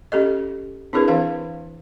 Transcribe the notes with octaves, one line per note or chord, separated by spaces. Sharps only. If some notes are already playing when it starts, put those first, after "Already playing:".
C#4 G4 A4 D#5
C4 D4 E4 G#4 A#4 B4
E3 C4 B4 F5